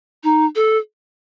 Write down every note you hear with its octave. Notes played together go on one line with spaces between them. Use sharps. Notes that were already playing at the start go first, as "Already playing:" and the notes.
D#4
A4